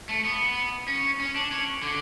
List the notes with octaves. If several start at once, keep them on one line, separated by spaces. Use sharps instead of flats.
A3
B3
C#4
C#4
D4
C#4
D3